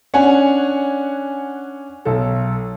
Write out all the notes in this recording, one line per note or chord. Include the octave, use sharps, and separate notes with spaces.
C#4 D4 F#5 G#5
B1 A4